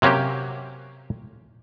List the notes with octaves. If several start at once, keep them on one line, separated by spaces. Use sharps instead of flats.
C3 F#3 A#3 C#4 G4